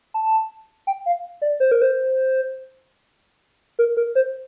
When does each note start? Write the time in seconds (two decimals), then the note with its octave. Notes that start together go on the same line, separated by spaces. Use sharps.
0.14 A5
0.87 G5
1.06 F5
1.42 D5
1.60 C5
1.72 A#4
1.82 C5
3.79 A#4
3.97 A#4
4.15 C5